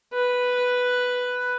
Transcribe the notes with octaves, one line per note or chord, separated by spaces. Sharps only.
B4